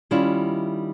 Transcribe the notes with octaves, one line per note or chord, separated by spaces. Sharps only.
D#3 G3 C#4 E4 F4